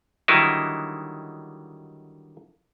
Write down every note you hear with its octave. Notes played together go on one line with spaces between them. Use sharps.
D3 D#3 F#3 G3 D#4 E4